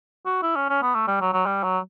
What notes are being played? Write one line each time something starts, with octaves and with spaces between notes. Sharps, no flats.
F#4
E4
C#4
C#4
B3
A3
G3
F#3
F#3
G3
F#3